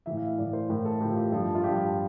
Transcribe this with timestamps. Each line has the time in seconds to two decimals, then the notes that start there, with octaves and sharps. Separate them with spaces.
0.06 A2 E3 E5
0.17 F5
0.27 E5
0.38 A2 E3 D5
0.53 C5
0.69 A2 E3 A#4
0.85 A4
1.00 A2 E3 G4
1.09 F4
1.17 G4
1.32 G2 F3 A4
1.55 F4
1.63 G2 F3 G4